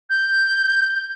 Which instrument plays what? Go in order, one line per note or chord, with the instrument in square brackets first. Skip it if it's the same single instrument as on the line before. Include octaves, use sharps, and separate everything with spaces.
[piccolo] G6